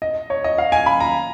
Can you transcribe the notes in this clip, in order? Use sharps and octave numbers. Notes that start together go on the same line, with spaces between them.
D#5
C#5
D#5
F5
G#5
B5
A#5